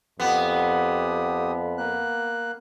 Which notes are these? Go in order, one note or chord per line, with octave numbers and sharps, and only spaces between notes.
F2 B3 G4 D#6
A#3 F#6